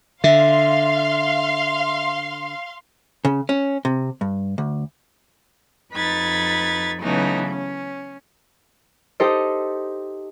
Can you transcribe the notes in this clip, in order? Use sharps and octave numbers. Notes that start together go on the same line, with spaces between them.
D3 E5 F5 C6
C#3
C#4
C3
G2
D2
F2 D#4 B4 B5 G#6 A6
C#3 E3 F#3 A3 B3 D#4
C#4
D#4 G4 A4 C5 D#5